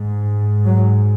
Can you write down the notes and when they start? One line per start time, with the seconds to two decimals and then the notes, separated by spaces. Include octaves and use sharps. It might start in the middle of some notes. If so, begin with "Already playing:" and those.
Already playing: G#2
0.65 F#3